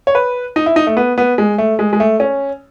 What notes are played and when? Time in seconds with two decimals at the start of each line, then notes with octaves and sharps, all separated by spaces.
0.07 C#5
0.15 B4
0.56 D#4
0.66 E4
0.76 D#4
0.87 A3
0.97 B3
1.18 B3
1.38 G#3
1.58 A3
1.79 G#3
1.93 G#3
2.00 A3
2.20 C#4